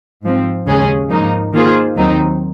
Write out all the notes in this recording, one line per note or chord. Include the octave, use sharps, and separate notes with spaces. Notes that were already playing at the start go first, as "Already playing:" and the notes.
G#2 F3 C4
D#2 C#3 G#3 C#4 G#4
G#2 F3 A#3 D#4
D#3 A#3 F4 G#4 C5
D#2 D#3 F#3 C4 D#4